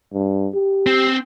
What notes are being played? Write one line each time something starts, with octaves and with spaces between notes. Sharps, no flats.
G2
G4
C4